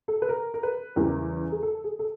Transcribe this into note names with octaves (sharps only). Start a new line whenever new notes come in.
A4
B4
A#4
A#4
B4
E2 C#3 E3 G3 A#4
G#4
A4
G#4
A4